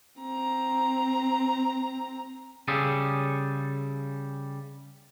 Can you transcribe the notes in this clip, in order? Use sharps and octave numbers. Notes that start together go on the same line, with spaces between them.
C4 A#5
C#3 G3 G#4 A4